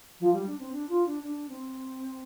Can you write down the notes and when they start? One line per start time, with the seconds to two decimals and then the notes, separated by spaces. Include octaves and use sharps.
0.20 F3
0.33 G3
0.46 D4
0.59 C4
0.72 D4
0.89 F4
1.06 D4
1.23 D4
1.49 C4